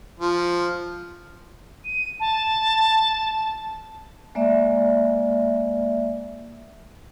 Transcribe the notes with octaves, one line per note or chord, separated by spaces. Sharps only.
F3
D#7
A5
G#3 A#3 D5 E5